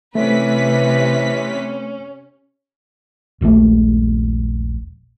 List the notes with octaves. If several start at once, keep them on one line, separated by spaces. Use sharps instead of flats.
C3 E3 A3 C#4 B4 B6
D#1 A#1 G#3 A3